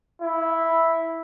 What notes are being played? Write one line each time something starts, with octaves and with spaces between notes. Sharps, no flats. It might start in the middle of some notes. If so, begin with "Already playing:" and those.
E4